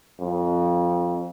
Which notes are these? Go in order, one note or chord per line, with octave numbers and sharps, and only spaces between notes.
F2